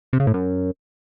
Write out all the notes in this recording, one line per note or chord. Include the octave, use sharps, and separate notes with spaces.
C3
C#3
A2
F#2